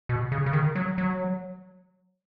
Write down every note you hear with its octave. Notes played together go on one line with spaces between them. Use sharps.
B2
C#3
C#3
D#3
F#3
F#3